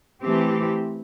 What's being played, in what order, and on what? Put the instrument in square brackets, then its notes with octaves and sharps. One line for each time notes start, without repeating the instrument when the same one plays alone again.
[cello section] E3 A3 C4 G4